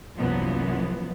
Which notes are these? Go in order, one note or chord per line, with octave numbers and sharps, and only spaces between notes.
C2 F#2 A#2 E3 F3 B3